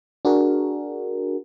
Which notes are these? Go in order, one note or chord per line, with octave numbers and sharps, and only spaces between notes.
D4 F#4 G#4 A#4